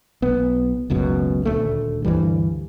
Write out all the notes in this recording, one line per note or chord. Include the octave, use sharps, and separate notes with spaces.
B1 B3
F#1 C#2 F#2 B2
D#1 D2 A3
D2 G2 E3 G3